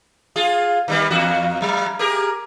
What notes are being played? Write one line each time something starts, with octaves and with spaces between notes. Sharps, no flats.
F4 G#4
D#3 G3 B3
E2 F#4
F#3
G4 G#4 A#4